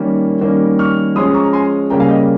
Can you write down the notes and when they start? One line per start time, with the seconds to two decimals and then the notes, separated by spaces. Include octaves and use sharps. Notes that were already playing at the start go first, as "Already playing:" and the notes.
Already playing: D#3 G3 A#3 C#4
0.41 D#3 G3 A#3 C#4
0.79 C#6 F6
1.15 F3 G#3 C#4 C6 D#6
1.34 A#5 C#6
1.45 A#5
1.53 G#5 C6
1.90 C#3 G3 A#3 C#4 G5 A#5
2.00 F5 G#5
2.09 D#5 G5